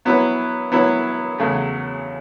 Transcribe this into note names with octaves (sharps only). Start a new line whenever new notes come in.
F#3 B3 E4 B4
F#3 B3 E4 B4
E2 C#3 F#3 A3